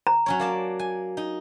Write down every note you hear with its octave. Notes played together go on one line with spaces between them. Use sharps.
A#5
F#3 C#4 C#5
A#3 D5 A5
G#5
D#4